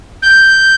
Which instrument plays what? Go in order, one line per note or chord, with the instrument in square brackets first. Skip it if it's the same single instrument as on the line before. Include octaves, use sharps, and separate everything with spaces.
[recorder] G6